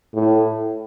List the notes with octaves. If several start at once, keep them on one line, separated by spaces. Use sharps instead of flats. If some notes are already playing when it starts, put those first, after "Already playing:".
A2